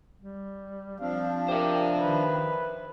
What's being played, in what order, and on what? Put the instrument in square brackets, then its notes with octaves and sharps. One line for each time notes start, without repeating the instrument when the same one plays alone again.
[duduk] G3
[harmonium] F3 D4 [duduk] C4 [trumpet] F5
[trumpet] G4 [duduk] A#4 [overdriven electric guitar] C5 E5
[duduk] D#3 [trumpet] B4